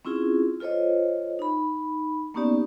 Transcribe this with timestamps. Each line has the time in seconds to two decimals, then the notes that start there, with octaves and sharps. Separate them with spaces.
0.05 C4 C#4 E4 F4 G#4
0.60 F4 A4 C5 C#5 D#5
1.39 D#4 B5
2.34 A#3 B3 C#4 D#4 G4 D5